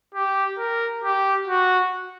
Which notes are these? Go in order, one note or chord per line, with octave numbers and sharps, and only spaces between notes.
G4
A#4
G4
F#4